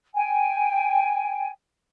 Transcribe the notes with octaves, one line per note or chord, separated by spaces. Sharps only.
G5 G#5